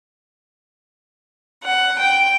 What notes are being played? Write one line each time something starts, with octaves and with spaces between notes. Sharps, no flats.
F#5
G5